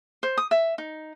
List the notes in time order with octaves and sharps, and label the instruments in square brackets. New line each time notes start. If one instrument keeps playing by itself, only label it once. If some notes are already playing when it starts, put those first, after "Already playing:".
[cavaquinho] C5
D#6
E5
D#4